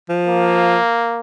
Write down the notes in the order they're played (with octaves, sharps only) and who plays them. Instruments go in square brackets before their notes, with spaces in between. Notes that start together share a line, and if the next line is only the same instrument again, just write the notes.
[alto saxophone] F3
[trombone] A#3